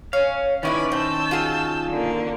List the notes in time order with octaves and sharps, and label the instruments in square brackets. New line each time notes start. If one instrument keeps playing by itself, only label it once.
[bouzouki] C#4 [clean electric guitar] F5
[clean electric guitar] D#3 C#4 [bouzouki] B3 E4 G#5 [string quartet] B4 D5 B5
[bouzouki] C4 [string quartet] A5 E6 G6
[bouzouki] F4 F#4 G#4
[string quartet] D3 A#3